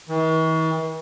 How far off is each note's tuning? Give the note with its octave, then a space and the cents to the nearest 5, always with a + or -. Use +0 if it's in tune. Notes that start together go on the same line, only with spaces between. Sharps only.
E3 -45